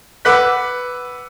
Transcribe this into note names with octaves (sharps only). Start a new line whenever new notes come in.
B4 F#5 D6 E6 F#6 B6